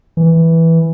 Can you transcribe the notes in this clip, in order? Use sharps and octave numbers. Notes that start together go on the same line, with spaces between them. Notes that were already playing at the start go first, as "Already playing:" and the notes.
E3